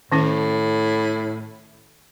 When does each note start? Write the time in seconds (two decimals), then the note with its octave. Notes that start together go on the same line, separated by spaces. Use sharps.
0.12 A2 D#3 C#4 E4